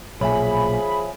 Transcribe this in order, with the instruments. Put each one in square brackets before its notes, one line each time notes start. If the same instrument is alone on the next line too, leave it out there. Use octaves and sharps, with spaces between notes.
[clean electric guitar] B1 A#2 [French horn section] F3 G#4 [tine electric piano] C#5 E5 G#5 [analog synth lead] B5